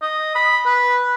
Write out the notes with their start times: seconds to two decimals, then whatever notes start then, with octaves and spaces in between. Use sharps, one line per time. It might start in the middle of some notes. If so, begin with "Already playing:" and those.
0.02 D#5
0.35 B5
0.66 B4